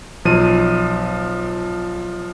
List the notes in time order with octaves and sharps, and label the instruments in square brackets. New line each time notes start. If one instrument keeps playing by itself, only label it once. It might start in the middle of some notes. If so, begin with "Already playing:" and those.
[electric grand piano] B1 F3 D#7